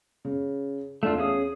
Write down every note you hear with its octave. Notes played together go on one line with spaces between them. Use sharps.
C#3
E2 A3 D4 F4 F5
C#4 G#4 D#6